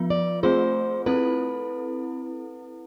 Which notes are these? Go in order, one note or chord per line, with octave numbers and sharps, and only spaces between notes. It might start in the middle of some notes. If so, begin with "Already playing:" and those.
Already playing: F3 B3 F4
D5
A3 C4 F4 G#4 C5
C4 E4 A4 B4